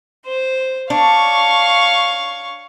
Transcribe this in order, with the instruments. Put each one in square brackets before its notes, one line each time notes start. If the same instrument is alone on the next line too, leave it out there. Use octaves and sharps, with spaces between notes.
[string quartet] C5
[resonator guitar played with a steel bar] D4 [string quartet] C#5 F5 C#6